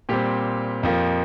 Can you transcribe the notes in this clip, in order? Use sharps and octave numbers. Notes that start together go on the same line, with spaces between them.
A#2 G3 C4 G4
F2 F3 A#3